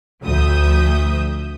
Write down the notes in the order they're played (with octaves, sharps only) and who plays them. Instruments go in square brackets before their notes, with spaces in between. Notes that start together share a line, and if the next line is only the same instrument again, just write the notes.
[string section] D2 F3 E5 D#6 G6